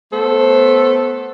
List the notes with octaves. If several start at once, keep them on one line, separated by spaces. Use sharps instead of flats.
A3 B3 A4 C5